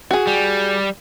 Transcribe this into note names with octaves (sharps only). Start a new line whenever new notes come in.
F#4 G#4
G3